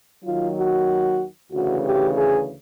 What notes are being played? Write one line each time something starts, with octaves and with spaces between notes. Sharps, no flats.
D#2 D#3 F#3 F4
F#4
D2 C#3 E3 F#4
G4
G#4